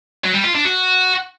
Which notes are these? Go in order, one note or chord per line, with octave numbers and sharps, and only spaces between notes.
F#3
G3
F4
D4
F#4